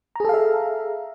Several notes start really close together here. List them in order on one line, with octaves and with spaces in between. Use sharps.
A#5 G#4 A4 F5 E5